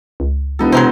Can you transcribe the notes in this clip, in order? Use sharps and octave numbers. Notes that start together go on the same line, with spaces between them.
C#2
E1 B3 D#4 A4
C3 F#3 B3 C4 D#4 A#4 C5